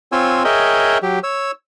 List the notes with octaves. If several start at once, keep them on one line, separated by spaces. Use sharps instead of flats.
C4 F4 C#5 G#5 E6
G#4 A#4 C#5 D#5 E5 G5
F#3 G4
C#5 E6